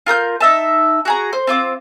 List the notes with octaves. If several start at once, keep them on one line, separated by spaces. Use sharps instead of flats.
F4 A#4 D#6 G6
D#4 E5 A5
F#4 G#4 A#5
C5
C4 F4 D6